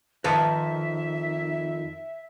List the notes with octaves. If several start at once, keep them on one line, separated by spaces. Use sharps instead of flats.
F2 D#3 B4 E5 F5 A5